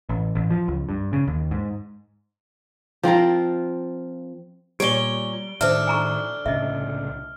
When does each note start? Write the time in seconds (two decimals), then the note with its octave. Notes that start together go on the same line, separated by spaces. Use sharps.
0.09 A1
0.35 A1
0.51 F3
0.68 C#2
0.89 G2
1.13 C#3
1.28 D#2
1.51 G#2
3.03 F3 C4 F4 A#4
4.80 A#2 G3 G4 C#5 C#6 D7 G7
5.61 A2 D#3 D4 A4 C5 E5 F6
5.87 G#5 A#5 C#6
6.46 C2 A2 C#3 D#5 E5